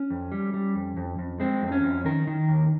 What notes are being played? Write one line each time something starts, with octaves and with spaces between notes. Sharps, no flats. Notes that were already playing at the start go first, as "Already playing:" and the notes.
Already playing: C#4
F2
G3
G3
F2
F2
F2
G#3 C4
F2
C4
C#4
F2
D#3 A#4
D#3
D#2